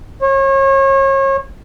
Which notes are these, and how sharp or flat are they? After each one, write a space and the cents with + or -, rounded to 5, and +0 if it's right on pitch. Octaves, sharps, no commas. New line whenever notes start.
C#5 -35